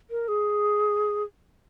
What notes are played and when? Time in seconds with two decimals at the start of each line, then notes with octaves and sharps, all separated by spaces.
0.10 A#4
0.28 G#4